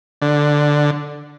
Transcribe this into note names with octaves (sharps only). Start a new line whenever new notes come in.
D3